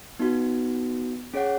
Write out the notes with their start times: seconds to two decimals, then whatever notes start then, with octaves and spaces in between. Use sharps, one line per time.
0.19 B3 D#4 F#4
1.34 C#4 G#4 C#5 F#5